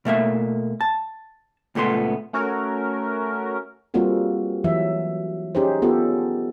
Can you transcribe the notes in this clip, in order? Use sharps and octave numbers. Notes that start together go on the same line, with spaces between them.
B2 A3 A#3 E5
A5
C#2 A#2 A3 B3 C6
A3 C#4 F#4 A#4
G3 A#3 C4 F4 F#4 A4
E3 F#3 E5
C#4 D#4 G4 G#4 C5
B3 F4 G4 A4